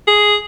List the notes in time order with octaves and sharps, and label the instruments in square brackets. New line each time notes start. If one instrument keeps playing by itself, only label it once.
[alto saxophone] G#4